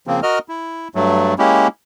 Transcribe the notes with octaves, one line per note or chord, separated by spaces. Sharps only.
C#3 F3 A#3 C4
F#4 A#4 D#5 F6
E4
G2 F#3 A3
G#3 A#3 C#4 E4 G4